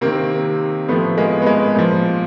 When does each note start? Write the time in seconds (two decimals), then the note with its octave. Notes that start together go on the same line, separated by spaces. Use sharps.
0.01 C3 D#3 A#3 C4
0.88 A2 F3 A3 B3
1.17 G#3 A#3
1.42 B3
1.46 G#3 A#3
1.76 A#2 F3